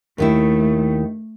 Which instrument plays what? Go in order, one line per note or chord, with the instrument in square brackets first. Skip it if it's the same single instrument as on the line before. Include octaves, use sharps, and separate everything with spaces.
[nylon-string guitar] D#2 D#3 E4 [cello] A3